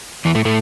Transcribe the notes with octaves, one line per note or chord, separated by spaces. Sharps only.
E2 E3
A2 A3
A2 A3